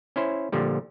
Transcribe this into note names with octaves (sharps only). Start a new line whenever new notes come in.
C#4 E4 C5
A#2 D3 F3 G3